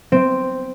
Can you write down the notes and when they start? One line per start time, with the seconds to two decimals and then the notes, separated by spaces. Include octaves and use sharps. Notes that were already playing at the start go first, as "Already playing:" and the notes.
0.12 C4